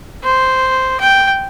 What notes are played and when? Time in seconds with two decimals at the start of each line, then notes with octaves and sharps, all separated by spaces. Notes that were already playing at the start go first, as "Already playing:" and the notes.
0.24 C5
1.00 G5